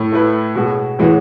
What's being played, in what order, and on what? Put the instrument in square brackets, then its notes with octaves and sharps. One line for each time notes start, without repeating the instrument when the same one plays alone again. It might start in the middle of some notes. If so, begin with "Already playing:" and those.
Already playing: [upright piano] A2
[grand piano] A3 E4 B4
B2 G#3 B3 F#4
[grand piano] A2 G#3 C#4 F#4 [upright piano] E3